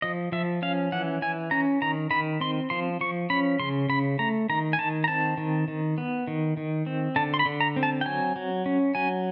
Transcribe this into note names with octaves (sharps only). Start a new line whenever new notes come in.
F3 D#5
F3 E5
C#4 F5
E3 F#5
E3 G#5
C#4 A#5
D#3 A#5
D#3 B5
C4 C6
F3 C6
F3 C#6
C#4 B5
C#3 C6
C#3 B5
A3 A#5
D#3 A#5
G#5
D#3 A5
A#5
C4 A5
D#3
D#3
B3
D#3
D#3
C4
D3 A5
C6
B5
D3
A#5
C4
A5
G5
F#3 G#5
F#3
C#4
F#3 G#5